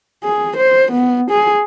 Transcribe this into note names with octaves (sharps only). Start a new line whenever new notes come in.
G#4
C5
B3
G#4